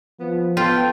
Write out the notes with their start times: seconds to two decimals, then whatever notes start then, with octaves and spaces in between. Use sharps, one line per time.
0.20 F3 B3
0.57 B3 F4 A4 G5